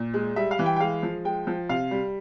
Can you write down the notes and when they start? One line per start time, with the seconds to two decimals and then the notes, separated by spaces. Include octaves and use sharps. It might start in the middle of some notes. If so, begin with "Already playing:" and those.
Already playing: A#2
0.14 G#3
0.36 G3 E5
0.51 F5
0.59 E3
0.66 G5
0.76 G5
0.80 G#3 F5
1.03 F3
1.25 G#3 G5
1.47 F3
1.69 C3 F5
1.91 G3